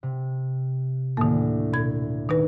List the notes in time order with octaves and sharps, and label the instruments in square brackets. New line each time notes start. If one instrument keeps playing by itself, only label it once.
[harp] C3
[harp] D2 A2 [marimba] D#3 A#3
[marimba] B2 G#6
D#3 D#4 B4